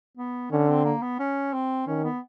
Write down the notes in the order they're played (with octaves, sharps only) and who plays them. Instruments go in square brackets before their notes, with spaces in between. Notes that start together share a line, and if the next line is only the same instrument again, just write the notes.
[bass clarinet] B3
[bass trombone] D3 [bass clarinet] C#4
[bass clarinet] C4
A#3
B3
C#4
C4
[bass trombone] D#3 [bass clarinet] C#4
[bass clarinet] B3